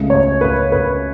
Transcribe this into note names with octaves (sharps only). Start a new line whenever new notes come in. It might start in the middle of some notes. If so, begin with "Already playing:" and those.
Already playing: C#2 C#3 A3
C#5
B4
B4